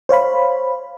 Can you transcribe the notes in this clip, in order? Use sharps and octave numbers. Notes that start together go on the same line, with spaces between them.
C5 C#5 F5 B5